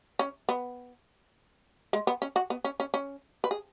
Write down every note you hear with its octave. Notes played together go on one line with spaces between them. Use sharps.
C#4
B3
G#3
B3
C#4
F#4
B3
C#4
C#4
C#4
B4
G#4